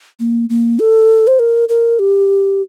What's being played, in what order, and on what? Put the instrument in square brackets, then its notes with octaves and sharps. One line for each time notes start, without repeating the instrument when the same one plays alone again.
[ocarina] A#3
A#3
A4
C5
A#4
A#4
G4